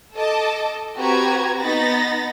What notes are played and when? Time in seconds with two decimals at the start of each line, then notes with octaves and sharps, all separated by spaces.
0.15 A4 D#5 A5 D6
0.97 C4 F#4 G4 B4 A#5 G#6
1.61 B3 D#4 B5 A6 A#6